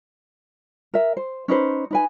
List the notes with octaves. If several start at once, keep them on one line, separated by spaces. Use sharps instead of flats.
A#4 E5
C5
C#4 D#4 B4 C5
D#4 B4 G#5